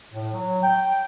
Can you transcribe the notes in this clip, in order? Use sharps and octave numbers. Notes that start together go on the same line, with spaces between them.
A2
F#3
G5